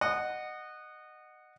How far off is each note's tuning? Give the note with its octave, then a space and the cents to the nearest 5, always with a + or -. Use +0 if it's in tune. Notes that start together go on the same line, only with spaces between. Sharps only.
D#5 -20 F#5 +0